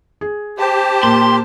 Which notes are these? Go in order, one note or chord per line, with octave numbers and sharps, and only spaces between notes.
G#4
G4 C5 A5
A#2 C6